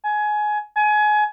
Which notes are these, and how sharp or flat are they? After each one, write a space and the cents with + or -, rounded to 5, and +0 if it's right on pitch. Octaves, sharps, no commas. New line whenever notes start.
G#5 +20
G#5 +25